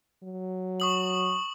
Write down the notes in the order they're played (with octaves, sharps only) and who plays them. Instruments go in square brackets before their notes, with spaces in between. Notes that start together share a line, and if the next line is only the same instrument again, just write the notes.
[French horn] F#3
[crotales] C#6 D#6 F#7